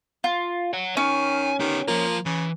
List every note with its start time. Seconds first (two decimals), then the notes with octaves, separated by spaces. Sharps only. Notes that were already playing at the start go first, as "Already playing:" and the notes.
0.24 F4
0.73 C#5 F#5
0.97 D#3 C#4 G#5
1.60 D#3 B3 G4
1.88 F3 A#3 F4
2.26 C#3 E3